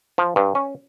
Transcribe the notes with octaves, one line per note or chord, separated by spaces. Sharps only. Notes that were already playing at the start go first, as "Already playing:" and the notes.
F3
G2
C#4